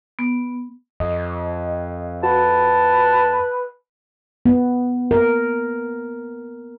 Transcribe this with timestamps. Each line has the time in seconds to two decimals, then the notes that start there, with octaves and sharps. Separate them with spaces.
0.19 B3
1.00 F2 D#5
2.23 F#4 B4 A5
4.46 B3
5.11 A#4